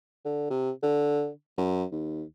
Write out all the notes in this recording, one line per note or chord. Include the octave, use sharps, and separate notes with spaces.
D3
C3
D3
F#2
D#2